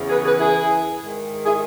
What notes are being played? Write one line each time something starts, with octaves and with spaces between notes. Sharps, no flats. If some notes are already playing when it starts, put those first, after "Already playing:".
Already playing: E2 C#3 E3
G#4 B4
G#4 B4
E4 G#4
G#2 D#3
E4 G#4